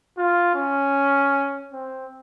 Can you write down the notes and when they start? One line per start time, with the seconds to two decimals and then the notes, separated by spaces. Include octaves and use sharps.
0.18 F4
0.55 C#4
1.72 C4